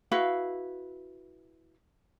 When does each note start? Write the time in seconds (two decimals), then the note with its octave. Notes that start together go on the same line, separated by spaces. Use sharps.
0.12 E4 F#4 B4 F5